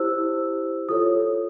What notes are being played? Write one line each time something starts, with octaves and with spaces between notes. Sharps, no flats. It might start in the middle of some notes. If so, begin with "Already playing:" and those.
Already playing: E4 G4 C5 E6
F4 A4 C#5 D#6